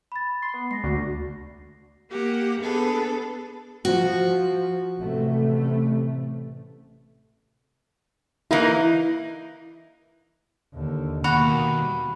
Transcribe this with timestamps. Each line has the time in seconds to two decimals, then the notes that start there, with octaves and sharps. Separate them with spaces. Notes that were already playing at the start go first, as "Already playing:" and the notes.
0.12 B5 A6
0.42 B5 C6 C7
0.54 B3
0.71 G#3 A#6 C7
0.84 D2 F#4
2.10 A#3 G4 F#5
2.61 B3 D4 G#4 A4 B4
3.85 F3 F#4
4.98 A1 C3 A3
8.51 E3 A#3 D#4 E4
10.73 D#2 D3
11.24 D#2 B2 A#3 F#4 B5
11.77 G3